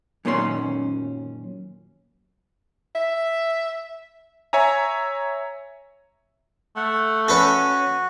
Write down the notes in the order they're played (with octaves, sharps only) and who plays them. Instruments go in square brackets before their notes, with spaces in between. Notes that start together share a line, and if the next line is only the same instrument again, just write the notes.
[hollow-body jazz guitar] F#2 A#2 D#3 C#4 E4 C6
[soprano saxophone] E5
[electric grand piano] C#5 E5 G#5 A#5
[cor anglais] A3 [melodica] F#5
[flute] C#4 [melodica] F#4 [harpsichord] A4 B4 C#5